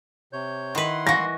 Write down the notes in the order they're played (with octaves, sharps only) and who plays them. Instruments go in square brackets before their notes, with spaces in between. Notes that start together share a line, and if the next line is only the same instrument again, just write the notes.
[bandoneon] C3 C#5 G6
[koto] D#3 B4 [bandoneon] E4 F#5 C6
[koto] E3 F#4 [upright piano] A#6